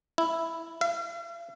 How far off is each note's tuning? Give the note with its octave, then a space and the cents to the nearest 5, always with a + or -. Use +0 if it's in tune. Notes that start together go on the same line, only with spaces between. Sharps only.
E4 +0
F5 -45